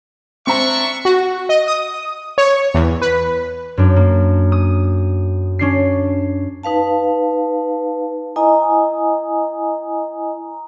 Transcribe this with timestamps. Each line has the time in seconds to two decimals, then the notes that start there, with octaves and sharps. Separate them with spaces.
0.47 C4 D4 E5 A#5 C#6
1.05 F#4
1.49 D#5
1.67 D#6
2.38 C#5
2.74 E2
3.02 B4
3.77 F#2 D4
3.96 A#3
4.52 D#6
5.59 C#4 D4 C7
6.63 D#4 B4 F5 A5
8.36 E4 D#5 G#5 A#5 D#6